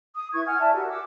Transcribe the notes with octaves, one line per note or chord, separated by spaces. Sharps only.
D#6
E4 B4 C#6 G#6
F#5 G#5 F6
D5 E5 A5
F#4 G4 A4 A#4
F#5 D6 E6